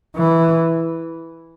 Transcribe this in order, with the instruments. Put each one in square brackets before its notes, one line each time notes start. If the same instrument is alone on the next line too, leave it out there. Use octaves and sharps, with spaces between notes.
[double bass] E3